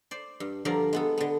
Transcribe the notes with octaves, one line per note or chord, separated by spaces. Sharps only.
C5 D5
G2
G2 D3 F3 A#4 D5 A#5
G#3 B3 A4
D3 B3